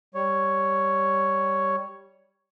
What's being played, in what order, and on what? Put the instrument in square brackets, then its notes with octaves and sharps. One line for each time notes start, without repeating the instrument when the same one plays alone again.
[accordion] G3 C#5